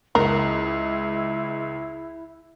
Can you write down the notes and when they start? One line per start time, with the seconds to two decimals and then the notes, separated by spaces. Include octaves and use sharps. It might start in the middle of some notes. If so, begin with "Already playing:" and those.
0.15 C#2 E4 A#4